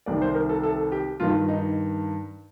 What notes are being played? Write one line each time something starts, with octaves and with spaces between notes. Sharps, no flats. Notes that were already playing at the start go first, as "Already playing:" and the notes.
C2 C3 D#3 D5
C5
A#4
A4
A4
G4
G2 D#3 F4
D#4